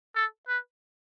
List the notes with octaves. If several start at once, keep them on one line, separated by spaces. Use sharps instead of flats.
A4
B4